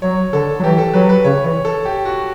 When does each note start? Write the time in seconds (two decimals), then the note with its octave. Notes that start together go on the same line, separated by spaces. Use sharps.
0.02 F#3 C#5
0.33 D3 A4
0.59 F#3
0.63 E3 G4
0.78 A4
0.94 F#3 B4
1.09 B4
1.24 C#3 C#5
1.44 E3 C#5
1.65 A4
1.85 G4
2.05 F#4